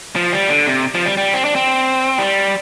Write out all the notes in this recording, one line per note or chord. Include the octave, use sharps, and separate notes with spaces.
F3
G3
D3
C3
F3
G3
G3
C4
D4
C4
G3